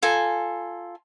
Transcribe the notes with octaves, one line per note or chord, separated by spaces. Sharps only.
F4 A4 G#5 A#5